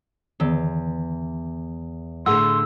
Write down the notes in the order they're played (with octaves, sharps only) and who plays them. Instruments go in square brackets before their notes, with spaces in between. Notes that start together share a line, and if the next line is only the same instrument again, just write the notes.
[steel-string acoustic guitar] E2 [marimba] D3 D#3 B3
[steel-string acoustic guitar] A2 D3 [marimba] G#4 F#5 [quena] C6 [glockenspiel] E6